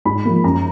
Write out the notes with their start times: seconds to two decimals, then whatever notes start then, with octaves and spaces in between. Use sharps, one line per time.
0.05 G#2 B5
0.25 F3 A#3
0.44 F#2 A#5